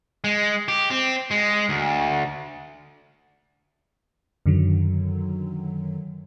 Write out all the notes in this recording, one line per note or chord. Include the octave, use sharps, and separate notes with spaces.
G#3
G4
C4
G#3
D2
F#2 D3 D#3 F#3